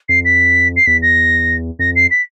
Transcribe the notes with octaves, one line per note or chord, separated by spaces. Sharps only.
F2 C7
B6
C7
E2 B6
A#6
F2 A#6
C7
B6